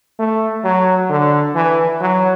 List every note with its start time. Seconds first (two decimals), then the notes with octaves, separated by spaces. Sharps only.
0.19 A3
0.64 F#3
1.09 D3
1.55 E3
2.00 F#3